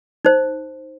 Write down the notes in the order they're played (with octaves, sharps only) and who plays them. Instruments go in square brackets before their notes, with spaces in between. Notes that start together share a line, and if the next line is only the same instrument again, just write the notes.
[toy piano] D#4 C5